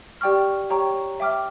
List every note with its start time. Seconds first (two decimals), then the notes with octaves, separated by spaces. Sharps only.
0.21 G4 D5 G5 C#6 F6
0.70 G4 C#5 G5 A#5 C#6
1.20 E5 G5 D6 F6